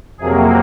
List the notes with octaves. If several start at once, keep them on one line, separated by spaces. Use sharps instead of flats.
F2 C3 F#3 A#3 G#4